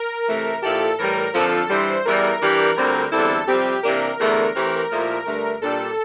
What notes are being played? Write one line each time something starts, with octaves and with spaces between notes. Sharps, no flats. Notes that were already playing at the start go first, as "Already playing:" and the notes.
Already playing: A#4
C3 E3 A3
A#2 F3 A#3 E4 G4 A4
A2 E3 G3 A#4
F2 D3 F3 A4
G2 E3 G3 C5
E2 E3 G3 A#4
E3 G3 D4 G4
D2 D3 G3 C4
E2 D3 G3 C4 E4 A4
F2 C3 G3 C4 G4
C3 E3 A#3 D4 G4 A#4
E2 D3 A3 A#4
E3 A3 C4 G4 A#4
A#2 F3 A3 E4 G4
G2 D3 A3
A#2 G3 D4 G4 A4